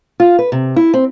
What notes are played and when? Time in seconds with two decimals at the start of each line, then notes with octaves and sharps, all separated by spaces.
0.20 F4
0.39 B4
0.52 C3
0.76 E4
0.94 C4